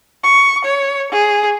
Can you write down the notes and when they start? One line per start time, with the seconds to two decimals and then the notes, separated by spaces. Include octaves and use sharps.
0.24 C#6
0.65 C#5
1.12 G#4